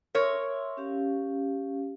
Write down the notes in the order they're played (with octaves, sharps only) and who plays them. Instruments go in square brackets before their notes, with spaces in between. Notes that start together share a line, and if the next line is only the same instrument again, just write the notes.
[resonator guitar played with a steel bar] A#4 C#5 [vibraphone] E5 C6 E6
[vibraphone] C#4 G4 F5